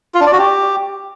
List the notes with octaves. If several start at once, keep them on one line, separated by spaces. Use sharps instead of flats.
F4
D4
D5
F#4
G4